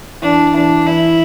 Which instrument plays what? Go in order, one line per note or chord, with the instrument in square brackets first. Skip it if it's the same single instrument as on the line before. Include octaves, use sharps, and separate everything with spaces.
[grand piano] E3 [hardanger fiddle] D4
[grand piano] E3 [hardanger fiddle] D4
[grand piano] E3 [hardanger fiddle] E4